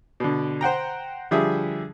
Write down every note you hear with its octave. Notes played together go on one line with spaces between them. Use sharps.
B2 D3
C5 F#5 G5 A#5
D3 F3 G3 G#4 E5 D#6